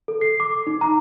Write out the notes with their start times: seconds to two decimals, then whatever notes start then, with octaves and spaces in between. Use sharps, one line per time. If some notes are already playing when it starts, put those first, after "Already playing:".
0.08 A4
0.21 C7
0.40 D6
0.67 D#4
0.81 A#5